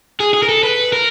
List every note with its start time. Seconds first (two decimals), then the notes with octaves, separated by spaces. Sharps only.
0.20 G#4
0.34 G#4
0.43 A#4
0.49 A4
0.63 B4
0.93 A#4